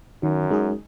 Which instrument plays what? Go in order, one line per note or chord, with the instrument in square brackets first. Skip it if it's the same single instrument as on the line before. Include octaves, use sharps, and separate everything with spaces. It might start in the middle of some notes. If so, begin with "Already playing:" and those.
[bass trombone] F#2 [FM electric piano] D#3
[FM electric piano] G#3 D#4 G#4